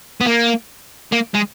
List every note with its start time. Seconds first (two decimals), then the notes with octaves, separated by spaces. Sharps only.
0.21 B3
0.26 A#3
1.13 A#3
1.35 G#3